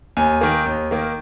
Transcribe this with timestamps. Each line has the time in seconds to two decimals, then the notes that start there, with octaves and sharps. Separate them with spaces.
0.17 D#2 G#5
0.41 D#3 A#3
0.66 D#2
0.91 D#3 A#3